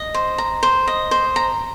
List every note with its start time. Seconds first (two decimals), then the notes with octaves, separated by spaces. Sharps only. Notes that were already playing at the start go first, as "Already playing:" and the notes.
Already playing: D#5
0.14 C5
0.38 A#5
0.63 C5
0.87 D#5
1.11 C5
1.36 A#5